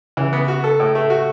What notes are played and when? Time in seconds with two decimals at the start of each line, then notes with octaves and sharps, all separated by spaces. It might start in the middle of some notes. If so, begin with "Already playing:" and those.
0.17 C#3 E3
0.33 B3
0.48 F#4
0.64 A4
0.80 A2
0.95 A3
1.10 F#4